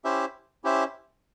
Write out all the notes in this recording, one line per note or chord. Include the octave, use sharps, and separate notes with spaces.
C#4 E4 G4 C5 E5
C#4 E4 G4 C5 E5